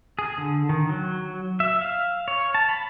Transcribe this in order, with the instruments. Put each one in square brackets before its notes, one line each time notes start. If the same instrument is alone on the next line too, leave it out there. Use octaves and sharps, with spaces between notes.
[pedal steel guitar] G#4
D3
D#3
F#3
E5
F5
C#5
A5
B5